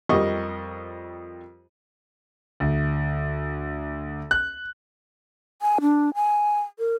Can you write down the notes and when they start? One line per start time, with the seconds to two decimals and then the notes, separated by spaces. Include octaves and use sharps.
0.09 F2 G3 A#4 D#5 C#6
2.60 D2
4.31 F#6
5.62 G#5
5.81 D4
6.15 G#5
6.79 A#4